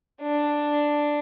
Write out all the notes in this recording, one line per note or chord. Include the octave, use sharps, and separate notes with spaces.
D4